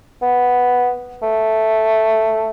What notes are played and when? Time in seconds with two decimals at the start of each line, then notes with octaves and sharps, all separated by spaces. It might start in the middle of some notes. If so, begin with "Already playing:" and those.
0.22 B3
1.22 A3